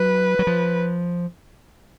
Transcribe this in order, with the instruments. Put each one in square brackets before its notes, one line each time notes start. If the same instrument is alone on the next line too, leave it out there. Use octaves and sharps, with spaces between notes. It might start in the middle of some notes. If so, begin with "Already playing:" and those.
Already playing: [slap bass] F#3 [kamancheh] B4
[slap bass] F#3
F3